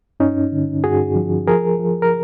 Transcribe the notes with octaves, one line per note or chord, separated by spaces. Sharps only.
G2 C#4 D#4
D3
G2 F#4 G#4
F3
F3 G#4 A#4
F3
A#4